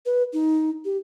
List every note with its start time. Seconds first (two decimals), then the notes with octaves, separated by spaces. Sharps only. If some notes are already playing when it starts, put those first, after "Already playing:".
0.06 B4
0.33 D#4
0.85 G4